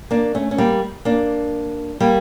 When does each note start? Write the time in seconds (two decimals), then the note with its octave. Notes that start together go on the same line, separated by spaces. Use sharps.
0.11 A#3 D4
0.35 A3 C#4
0.51 C#4
0.58 G3 A#3
1.05 A#3 D4
2.00 G3 A#3